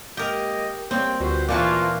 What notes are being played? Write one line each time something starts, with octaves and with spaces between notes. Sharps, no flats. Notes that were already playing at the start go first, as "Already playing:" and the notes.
G#3 A#3 G4 A#4 D#5
G3 A#3 C4 C#5 G5
D2 G3 F4 F#4 B4 C5
A#2 E3 A#3 F4 F#4 F5 A5 D6